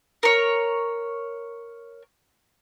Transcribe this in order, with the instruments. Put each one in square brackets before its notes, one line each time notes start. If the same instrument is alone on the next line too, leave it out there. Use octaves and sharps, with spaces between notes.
[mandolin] A#4 C#5